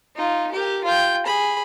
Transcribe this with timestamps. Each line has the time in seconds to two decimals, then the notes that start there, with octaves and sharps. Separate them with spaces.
0.16 D#4 F4
0.52 G4 A#4
0.84 F4 G5
1.26 G#4 B5